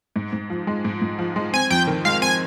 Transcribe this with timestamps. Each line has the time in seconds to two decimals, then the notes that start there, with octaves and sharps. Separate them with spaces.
0.16 G#2
0.33 G#2
0.50 F3
0.67 G#3
0.85 G#2
1.02 G#2
1.19 F3
1.36 G#3
1.53 C4 G#5
1.70 F2 G5
1.87 D#3
2.05 G#3 F5
2.22 C4 G#5